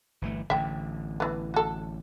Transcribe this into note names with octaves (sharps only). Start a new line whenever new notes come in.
G1 E3 A3
A1 D3 E5 G5
E3 B3
F#4 A4